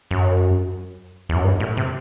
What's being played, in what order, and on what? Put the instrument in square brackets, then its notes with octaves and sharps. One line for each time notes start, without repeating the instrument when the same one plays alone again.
[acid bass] F#2
E2
F#2
G2
A2
C3